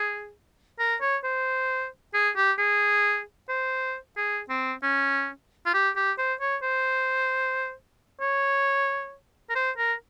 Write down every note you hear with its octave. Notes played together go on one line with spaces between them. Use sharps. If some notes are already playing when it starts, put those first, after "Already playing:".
Already playing: G#4
A#4
C#5
C5
G#4
G4
G#4
C5
G#4
C4
C#4
F4
G4
G4
C5
C#5
C5
C#5
A#4
C5
A#4